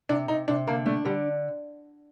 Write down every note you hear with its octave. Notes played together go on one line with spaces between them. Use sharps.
C3 D4
C3 D#4
C3 D4
D3 A#3
A3 D4
D3 G3